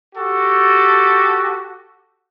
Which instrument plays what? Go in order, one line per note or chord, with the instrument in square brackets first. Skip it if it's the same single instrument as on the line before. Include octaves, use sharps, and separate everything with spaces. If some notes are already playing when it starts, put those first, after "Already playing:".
[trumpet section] F#4 G4 A4